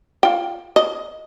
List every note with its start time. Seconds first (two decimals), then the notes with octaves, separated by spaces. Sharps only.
0.23 F4 G5
0.76 D#5